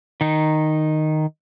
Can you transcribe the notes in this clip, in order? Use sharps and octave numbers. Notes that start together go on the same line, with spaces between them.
D#3 D#4